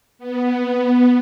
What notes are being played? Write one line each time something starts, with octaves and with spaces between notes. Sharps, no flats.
B3